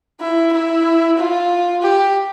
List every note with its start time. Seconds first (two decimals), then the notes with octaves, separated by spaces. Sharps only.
0.20 E4
0.53 E4
1.18 F4
1.82 G4